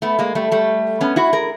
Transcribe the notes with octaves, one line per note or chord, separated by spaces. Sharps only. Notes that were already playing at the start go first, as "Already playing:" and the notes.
A3 B3
G#3 A#3
G3 A3
G3 A3
B3 C#4
E4 F#4
G#4 A#4